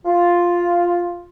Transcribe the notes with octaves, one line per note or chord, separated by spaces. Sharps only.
F4